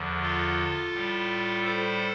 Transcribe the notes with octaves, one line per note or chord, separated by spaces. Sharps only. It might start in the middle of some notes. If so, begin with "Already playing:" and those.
Already playing: E2 D3 F3
F4 A4
A2 G3
A4 C5